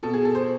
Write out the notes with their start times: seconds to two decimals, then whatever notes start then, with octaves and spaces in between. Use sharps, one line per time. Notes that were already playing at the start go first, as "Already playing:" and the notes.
0.03 B2 A4
0.13 G#4
0.25 A4
0.35 C5